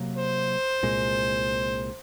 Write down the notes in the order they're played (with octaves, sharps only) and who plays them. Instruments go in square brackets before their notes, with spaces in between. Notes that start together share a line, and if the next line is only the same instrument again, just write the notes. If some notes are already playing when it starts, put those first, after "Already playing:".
Already playing: [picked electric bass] C3 F#3 A#3
[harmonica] C5
[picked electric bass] C2 A#2 G#3